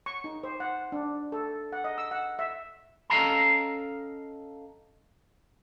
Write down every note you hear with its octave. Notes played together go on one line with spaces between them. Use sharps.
C#6
D#4
C5
F#5
D4
A4
F#5
D#5
E6
F#5
E5
C#4 A4 D#5 F5 A5 A#5